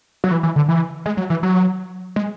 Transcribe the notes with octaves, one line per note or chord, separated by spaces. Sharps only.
F#3
E3
E3
D3
E3
G#3
F#3
E3
F#3
G#3